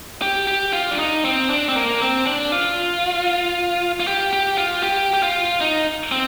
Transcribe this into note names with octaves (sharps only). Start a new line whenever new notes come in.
G4
G4
F4
D4
D#4
C4
D4
C4
A#3
C4
D4
F4
F4
G4
G4
F4
G4
G4
F4
D#4
C4